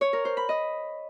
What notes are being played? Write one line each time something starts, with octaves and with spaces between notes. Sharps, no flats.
C#5
A#4
C5
B5
D#5